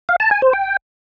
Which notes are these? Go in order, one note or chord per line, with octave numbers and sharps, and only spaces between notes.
F5
A5
G#5
C5
G5